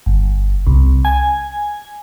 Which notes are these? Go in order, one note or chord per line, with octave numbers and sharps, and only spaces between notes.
G1
C2
G#5